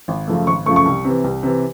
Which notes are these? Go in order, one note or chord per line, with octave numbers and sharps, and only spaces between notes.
G#1
F#2 C#3 F3 A3
G#1 C#6
F#2 C#3 F3 A3 C#6
C#6
C2
C3 E3
C2
C3 E3